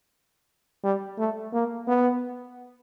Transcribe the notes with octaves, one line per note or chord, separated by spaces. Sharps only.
G3
A3
A#3
B3